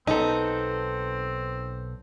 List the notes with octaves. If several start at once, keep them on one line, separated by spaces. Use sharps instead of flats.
B1 B3 C4 D#4 A4